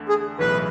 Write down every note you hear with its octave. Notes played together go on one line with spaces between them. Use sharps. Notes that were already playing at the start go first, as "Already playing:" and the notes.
Already playing: E2 D3 A3
G#4
B1 A2 E3 B4